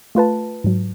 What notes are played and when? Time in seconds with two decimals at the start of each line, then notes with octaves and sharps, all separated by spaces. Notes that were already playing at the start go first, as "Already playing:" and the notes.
0.15 A3 F4 B4 A5
0.64 G#2 F#3